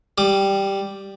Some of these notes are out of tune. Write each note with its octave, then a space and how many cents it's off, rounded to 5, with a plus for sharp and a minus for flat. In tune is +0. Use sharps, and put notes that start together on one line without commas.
G3 +0 D6 +35